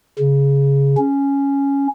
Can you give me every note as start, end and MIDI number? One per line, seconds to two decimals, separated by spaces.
0.19 0.95 49
0.97 1.87 61